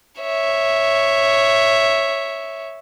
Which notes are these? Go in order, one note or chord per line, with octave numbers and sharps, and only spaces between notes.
C#5 E5